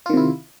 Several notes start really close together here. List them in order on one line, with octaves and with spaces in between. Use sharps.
F4 D#3 C3 E4